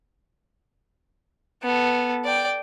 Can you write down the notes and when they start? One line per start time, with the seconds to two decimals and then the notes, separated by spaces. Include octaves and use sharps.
1.62 B3 A4
2.25 D5 G5